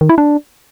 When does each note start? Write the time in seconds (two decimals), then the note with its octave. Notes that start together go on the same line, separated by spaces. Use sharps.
0.01 D#3
0.09 E4
0.18 D4